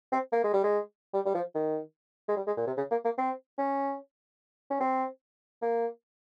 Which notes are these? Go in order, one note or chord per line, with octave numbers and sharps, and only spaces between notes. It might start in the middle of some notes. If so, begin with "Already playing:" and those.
C4
A#3
G#3
G3
G#3
G3
G3
F3
D#3
G#3
G3
G#3
A#2
C3
C#3
A#3
A#3
C4
C#4
C#4
C4
A#3